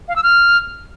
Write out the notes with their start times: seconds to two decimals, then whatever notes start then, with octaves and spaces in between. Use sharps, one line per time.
0.08 F5
0.16 E6
0.23 F6